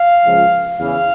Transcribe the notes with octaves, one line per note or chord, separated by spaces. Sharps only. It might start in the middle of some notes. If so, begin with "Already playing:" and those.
Already playing: F5
C#2 C#3 F3
E2 C#3 E3 F5